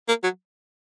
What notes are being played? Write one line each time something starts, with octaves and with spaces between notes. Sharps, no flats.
A#3
F#3